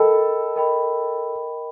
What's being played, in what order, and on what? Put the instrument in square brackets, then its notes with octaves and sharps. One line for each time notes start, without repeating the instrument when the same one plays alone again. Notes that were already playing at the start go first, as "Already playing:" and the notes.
Already playing: [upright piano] A4 [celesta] A#4 D#5 G5 B5
[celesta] A#4 D#5 G5 B5